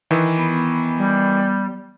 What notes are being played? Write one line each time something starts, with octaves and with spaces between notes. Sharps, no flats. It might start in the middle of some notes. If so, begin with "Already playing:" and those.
D#3 E3
B3
G3